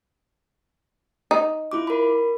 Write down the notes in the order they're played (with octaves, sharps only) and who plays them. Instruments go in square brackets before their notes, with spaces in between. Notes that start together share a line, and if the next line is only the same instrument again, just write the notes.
[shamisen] D#4
[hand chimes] E4 F4 D6
A#4 B5